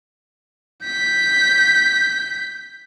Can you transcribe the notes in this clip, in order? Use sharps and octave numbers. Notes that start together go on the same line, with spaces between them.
G6 B6